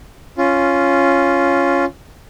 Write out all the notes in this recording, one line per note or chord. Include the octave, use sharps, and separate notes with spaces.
C#4 F4